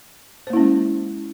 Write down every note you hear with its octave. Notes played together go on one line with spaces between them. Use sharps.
G#3 A#3 C#4 E4 C5